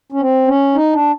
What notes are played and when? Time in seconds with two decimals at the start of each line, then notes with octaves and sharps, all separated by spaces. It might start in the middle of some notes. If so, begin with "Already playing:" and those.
0.12 C#4
0.21 C4
0.48 C#4
0.75 D#4
0.93 D4